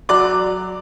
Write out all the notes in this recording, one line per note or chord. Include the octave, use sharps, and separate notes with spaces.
F#3 D5 D6